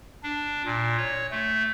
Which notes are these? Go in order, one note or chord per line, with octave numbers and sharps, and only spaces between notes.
D4
A#2
C#5
A3